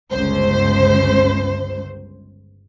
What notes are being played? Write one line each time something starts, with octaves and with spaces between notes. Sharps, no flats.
G1 C#2 C5